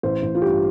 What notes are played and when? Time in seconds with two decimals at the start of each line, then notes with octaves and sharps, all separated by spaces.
0.03 A1 C5
0.22 A1
0.35 F4
0.42 G2 G4